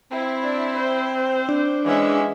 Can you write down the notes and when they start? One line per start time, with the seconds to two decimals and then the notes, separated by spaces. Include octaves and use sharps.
0.11 C4 E4
0.43 D4
0.76 C5
1.49 D4
1.86 E3 G#3 C#4 E5 F#5